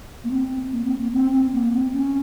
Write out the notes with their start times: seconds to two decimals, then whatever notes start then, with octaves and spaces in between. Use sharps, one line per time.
0.24 A#3
0.31 C4
0.72 A#3
0.85 C4
0.98 A#3
1.13 C4
1.32 C4
1.53 A#3
1.73 C4
1.94 C#4